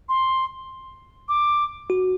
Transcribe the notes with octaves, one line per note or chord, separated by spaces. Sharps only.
C6
D6
F#4